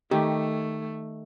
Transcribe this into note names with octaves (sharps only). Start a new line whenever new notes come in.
D#3 A3 G4